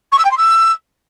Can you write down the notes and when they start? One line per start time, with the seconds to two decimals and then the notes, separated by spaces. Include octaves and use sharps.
0.12 C#6
0.18 E6
0.24 G5
0.31 C6
0.37 E6